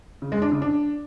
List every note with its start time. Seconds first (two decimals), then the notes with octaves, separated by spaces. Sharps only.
0.22 C#3
0.32 G#3
0.42 D4
0.52 C#3
0.62 D4